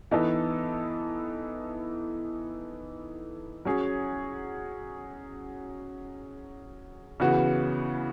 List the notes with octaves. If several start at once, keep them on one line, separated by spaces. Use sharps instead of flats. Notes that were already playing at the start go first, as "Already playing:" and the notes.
E3 B3 D#4 A4
F#3 C#4 G#4
C#3 E3 B3 F#4